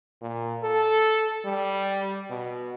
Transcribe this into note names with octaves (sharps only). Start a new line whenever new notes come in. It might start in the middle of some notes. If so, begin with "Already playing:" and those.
A#2
A4
G3
B2